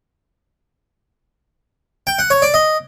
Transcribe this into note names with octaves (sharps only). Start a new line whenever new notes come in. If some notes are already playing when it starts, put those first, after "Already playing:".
G5
F#5
C#5
D5
D#5